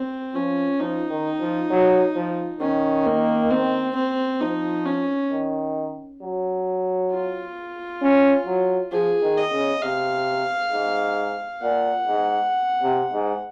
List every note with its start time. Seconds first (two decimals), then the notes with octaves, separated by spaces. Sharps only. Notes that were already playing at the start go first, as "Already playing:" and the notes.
Already playing: C4
0.35 F3 C#4
0.79 F3 D#4
1.10 D#3
1.40 F3
1.70 F#3
2.15 F3
2.60 D#3 C#4
3.06 A#3
3.50 C4
3.95 C4
4.41 F3 D#4
4.85 C#4
5.31 D#3
6.21 F#3
7.11 F4
8.02 C#4
8.46 F#3
8.91 F3 G#4
9.22 D#3
9.37 D#5
9.52 C#3
9.82 C3 F5
10.72 G#2
11.62 A#2 F#5
12.07 G#2
12.83 C3
13.13 G#2